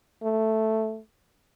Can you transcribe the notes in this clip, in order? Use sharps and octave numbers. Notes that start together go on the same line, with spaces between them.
A3